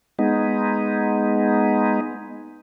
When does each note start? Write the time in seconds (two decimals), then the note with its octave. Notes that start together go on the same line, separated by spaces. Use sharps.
0.19 G#3 B3 D#4